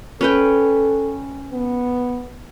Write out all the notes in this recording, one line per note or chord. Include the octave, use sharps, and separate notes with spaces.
C#4 A4 B4 G5
B3